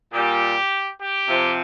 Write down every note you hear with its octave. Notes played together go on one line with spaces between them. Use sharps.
A#2 G3 G4
G4
C3 F3